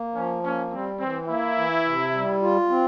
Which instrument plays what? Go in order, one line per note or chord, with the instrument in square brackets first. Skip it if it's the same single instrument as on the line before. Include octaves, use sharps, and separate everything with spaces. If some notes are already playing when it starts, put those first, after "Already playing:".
Already playing: [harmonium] A#3
[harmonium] F3 [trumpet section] C#4
[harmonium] A#3 [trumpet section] C#4
[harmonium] G3 [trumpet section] C4
[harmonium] E3 [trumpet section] C4
[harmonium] A#3 [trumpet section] E4
[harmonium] E3
C3
G3
F4
C4